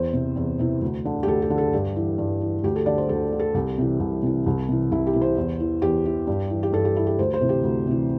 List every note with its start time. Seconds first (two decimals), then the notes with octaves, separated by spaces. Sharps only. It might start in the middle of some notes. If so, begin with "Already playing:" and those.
Already playing: E2 C5
0.13 C3 E3
0.36 E2
0.59 C3 E3
0.82 D2
1.05 D3
1.23 G4
1.27 D2 A4
1.42 G4
1.50 D3
1.58 A4
1.73 G2 G4
1.96 E3
2.18 G2
2.42 E3
2.63 D2 G4
2.76 A4
2.86 D3 D5
2.98 C5
3.09 D2 A4
3.33 D3
3.39 A4
3.54 C2 G4
3.78 C3 E3
4.00 C2
4.23 C3 E3
4.46 C2
4.69 C3 E3
4.91 C2 E4
5.07 G4
5.13 C3 E3
5.21 C5
5.37 E2
5.60 E3
5.82 E2 G4
6.06 E3
6.27 G2
6.50 E3
6.63 G4
6.73 G2 A4
6.85 G4
6.96 E3 E4
7.07 G4
7.18 D2 C5
7.34 C5
7.41 C3 E3
7.49 G4
7.63 D2
7.87 C3 E3